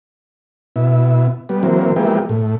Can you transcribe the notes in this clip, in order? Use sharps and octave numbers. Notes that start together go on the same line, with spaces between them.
B2 E4
G3 B3
E3 F#3 A#3 C4
F3 G#3 A#3 B3 E4 G4
A2